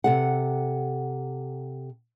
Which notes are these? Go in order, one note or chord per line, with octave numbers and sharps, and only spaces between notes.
C3 A4 F#5